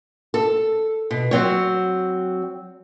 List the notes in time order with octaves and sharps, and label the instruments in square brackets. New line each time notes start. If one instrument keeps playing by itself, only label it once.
[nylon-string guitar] A4
B2
F#3 C4 C#5